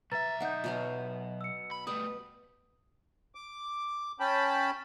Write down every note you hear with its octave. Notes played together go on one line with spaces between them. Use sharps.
B1 B4 E5 A#5 A6
D#4 D5 F#5 G6
B2 F#3 F5
E6 C#7
B5
G3 A3 B4 D#6
D6
C#4 G5 A5 B5